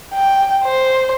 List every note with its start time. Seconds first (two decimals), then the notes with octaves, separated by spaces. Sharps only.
0.14 G5
0.64 C5